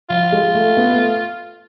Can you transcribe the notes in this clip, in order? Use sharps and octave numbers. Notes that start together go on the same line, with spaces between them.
F3 F4
G#3
A3
B3
A3